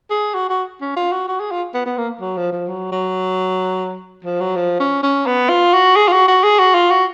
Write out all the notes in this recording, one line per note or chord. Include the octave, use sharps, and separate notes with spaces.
G#4
F#4
F#4
C#4
F4
F#4
F#4
G#4
F4
B3
B3
A#3
F#3
F3
F3
F#3
F#3
F3
F#3
F3
C#4
C#4
B3
F4
F#4
G#4
F4
F#4
F#4
G#4
F#4
F4
F#4